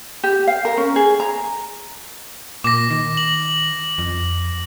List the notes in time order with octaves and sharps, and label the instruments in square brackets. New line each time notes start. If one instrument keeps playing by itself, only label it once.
[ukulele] G4
F5
A#4
C#4
G#4
A#5
[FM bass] A#2 [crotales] D6 A#6
[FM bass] D#3
[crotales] F#7
[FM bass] F2